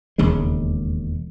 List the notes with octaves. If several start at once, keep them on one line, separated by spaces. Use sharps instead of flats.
E1 D#2 C#3 G#3